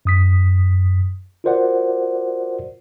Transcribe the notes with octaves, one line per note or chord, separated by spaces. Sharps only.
F#2 D#6 B6
F4 F#4 A#4 C5 D5 F#5